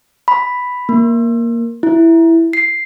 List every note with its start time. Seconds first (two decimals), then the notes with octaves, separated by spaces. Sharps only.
0.28 B5
0.89 A#3
1.83 E4
2.53 C7